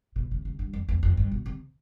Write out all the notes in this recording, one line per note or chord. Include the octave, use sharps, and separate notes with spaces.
B2
C3
C3
G2
F2
E2
F2
G2
B2
C3